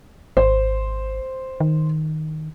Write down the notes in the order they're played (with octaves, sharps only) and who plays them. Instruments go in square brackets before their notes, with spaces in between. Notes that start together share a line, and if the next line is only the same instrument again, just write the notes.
[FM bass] G#1 [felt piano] C5
[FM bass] D#3